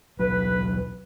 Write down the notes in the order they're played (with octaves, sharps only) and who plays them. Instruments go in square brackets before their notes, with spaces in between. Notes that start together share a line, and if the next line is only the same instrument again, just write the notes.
[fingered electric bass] D#1 B1 F#3 [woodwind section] B4